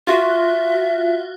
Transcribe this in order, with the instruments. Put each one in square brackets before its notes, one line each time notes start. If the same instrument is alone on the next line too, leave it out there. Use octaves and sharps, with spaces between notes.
[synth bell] F4 F#4 [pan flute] E5